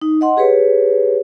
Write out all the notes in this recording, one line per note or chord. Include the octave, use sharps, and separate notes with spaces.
D#4
D#5 F#5 C6
G4 G#4 B4 C#5